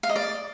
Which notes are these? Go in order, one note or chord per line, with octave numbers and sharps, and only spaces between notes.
F5
D#5
D5